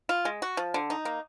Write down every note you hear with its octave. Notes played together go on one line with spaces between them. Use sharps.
F4
G#3
F#4
F3
D3
D#4
A#3